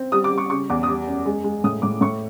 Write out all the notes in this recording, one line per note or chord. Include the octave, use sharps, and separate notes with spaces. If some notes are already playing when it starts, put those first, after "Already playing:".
Already playing: C4
G3 D#6
D6
G3
C#6
C#3 C#6
E2 D6
D#6
G3 D6
F#2
G#3
G#3
A2 D#6
A2 D6
A2 C#6